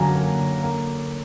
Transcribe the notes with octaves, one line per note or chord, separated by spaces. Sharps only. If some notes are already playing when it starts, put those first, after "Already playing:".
Already playing: F#2 D3 F#3 A#3 F5 F#5 G#5 A#5
A#3
D3
A#3